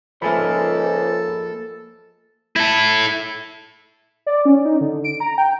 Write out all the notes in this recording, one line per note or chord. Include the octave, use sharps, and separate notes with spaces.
C#2 G#2 F3 A#3 A4 E5 G#5 B5
E4 A4
D5
C#4
D#4
D3
D7
A#5
G5